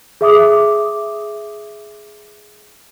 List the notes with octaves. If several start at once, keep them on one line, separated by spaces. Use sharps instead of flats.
G#4 E5 D6 D#6